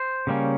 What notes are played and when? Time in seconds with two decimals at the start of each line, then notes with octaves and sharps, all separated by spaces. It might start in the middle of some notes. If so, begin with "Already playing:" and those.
Already playing: C5
0.27 C#3 G3 A#3 C#4